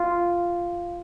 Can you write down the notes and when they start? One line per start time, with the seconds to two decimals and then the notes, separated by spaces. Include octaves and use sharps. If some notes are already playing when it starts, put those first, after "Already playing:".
Already playing: F4